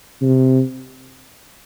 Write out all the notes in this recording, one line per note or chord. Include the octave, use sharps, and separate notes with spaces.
C3